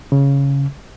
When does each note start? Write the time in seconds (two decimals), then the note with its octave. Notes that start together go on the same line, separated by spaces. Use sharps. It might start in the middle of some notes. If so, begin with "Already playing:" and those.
0.12 C#3